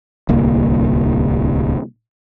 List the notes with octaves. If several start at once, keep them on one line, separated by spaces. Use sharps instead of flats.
D1 C2 A#3